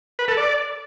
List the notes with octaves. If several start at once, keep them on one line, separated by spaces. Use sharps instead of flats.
B4
A4
D5